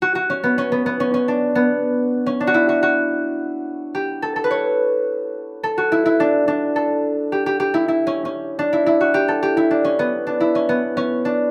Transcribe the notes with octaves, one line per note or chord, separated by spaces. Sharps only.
F#4
F#4
C#4
B3
C#4
B3
B3
C#4
C#4
D4
B3
C#4
D4
F#4
E4
F#4
F#4
G4
A4
A4
B4
C#5
A4
F#4
E4
E4
D4
D4
A4
G4
G4
G4
E4
E4
C#4
C#4
D4
E4
E4
F#4
G4
A4
G4
E4
D4
C#4
B3
D4
E4
C#4
B3
C#4
D4